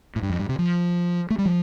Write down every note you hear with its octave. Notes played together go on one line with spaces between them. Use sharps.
A2
G2
F2
G2
C3
F3
A3
G3
F3